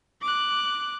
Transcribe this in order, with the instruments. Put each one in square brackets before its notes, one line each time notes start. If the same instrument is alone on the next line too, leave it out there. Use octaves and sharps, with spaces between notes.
[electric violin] D6 F#6